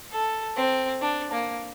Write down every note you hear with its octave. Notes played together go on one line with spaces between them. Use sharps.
A4
C4
D4
A#3